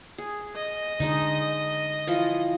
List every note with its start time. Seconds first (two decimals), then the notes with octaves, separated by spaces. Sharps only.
0.18 G#4
0.56 D#5
1.00 D3 G#3 D4 D#4
2.07 E3 F3 F4